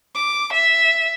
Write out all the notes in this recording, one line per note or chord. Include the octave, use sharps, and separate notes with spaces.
D6
E5